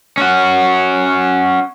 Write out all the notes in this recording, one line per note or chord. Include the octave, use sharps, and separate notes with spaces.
C#4 F#4